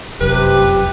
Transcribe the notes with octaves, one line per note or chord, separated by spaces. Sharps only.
F1 C2 F#2 C3 G4 B4